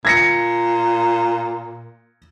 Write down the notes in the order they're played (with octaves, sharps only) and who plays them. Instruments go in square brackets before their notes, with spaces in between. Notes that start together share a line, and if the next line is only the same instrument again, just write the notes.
[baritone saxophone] A#2 [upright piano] G#6 A#6 C#7